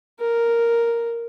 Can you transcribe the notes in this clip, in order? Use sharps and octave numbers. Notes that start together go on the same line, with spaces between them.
A#4